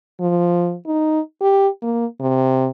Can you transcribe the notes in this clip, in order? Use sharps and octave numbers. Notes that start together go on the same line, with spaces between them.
F3
D#4
G4
A#3
C3